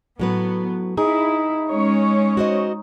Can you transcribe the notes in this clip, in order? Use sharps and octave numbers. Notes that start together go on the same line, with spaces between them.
A2 F#3 B3 B4
D#4 E4 G#4
G#3 C#4 C#5
F#4 C5 D#5